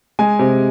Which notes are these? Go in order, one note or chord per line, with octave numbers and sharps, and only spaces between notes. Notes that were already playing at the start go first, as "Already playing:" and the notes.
G#3 G#5
C3